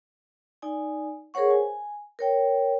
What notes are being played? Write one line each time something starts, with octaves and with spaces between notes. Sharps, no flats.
D#4 D5 G#5
G#4 A#4 C5 C#5 F#5 C#6
G#5
A#4 C#5 G5